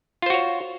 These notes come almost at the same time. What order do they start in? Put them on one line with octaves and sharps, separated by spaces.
F4 C5 F#4 C#5